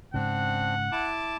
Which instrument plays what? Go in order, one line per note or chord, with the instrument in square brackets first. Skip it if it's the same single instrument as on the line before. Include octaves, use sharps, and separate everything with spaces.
[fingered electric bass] G#2 C#3 [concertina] C4 D4 [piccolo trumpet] F#5
[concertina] E4 A5 D6